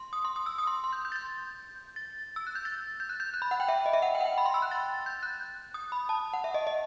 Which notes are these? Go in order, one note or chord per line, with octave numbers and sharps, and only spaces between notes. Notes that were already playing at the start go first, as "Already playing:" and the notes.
Already playing: C6
D#6
C6
D#6
E6
D#6
C6
C6
G6
G6
A6
G6
A6
E6
F#6
G6
A6
G6
F#6
G6
F#6
B5
F#5
G5
E5
D#5
E5
F#5
G5
F#5
G5
B5
C6
E6
F#6
A6
G6
F#6
D#6
B5
A5
F#5
E5
D#5
D#5